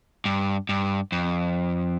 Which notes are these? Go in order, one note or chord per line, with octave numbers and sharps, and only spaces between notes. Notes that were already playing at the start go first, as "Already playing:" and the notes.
G2
G2
F2